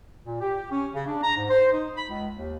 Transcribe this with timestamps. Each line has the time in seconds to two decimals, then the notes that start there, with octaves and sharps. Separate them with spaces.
0.23 A#2
0.41 G4
0.70 C#4
0.92 C#3
1.07 D4
1.22 A#5
1.36 G#2
1.49 C5
1.70 D#4
1.96 B5
2.08 C#2
2.34 D#2